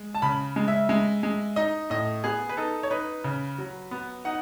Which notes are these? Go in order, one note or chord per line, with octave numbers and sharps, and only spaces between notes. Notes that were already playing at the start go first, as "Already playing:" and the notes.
Already playing: G#3
A5
C#3 B5
G#3
E5
G#3
G#3
D#4 D#5
A2 D#5
B3 G#4
B4
D#4 A4
C#5
D#4 B4
C#3
F#3
B3
D#4 F#5